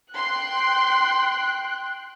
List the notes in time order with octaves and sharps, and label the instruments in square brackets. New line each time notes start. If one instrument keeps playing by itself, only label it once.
[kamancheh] G5 F#6 [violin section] C6